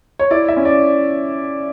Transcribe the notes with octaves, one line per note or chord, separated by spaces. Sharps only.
C#5
E4 D5
E5
C#4
D5